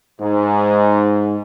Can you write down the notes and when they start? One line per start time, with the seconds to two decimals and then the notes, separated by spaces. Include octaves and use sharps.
0.20 G#2